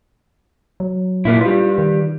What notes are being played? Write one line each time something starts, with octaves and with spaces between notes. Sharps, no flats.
F#3
A#2 A#3 E4
G3 F4 B4
D#3